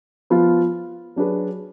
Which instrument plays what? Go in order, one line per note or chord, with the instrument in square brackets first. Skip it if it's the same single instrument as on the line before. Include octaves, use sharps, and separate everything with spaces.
[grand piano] F3 B3 F4
F#3 D4 G#4 B4